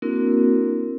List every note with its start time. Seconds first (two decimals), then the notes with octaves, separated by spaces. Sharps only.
0.02 A#3 C4 D4 E4 F#4 A#4